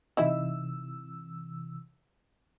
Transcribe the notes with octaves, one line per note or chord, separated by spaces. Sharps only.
C3 E3 D#4 E4 E5 E6